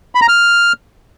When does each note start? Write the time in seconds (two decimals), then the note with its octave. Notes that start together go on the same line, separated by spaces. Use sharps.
0.15 B5
0.22 A#5
0.28 F6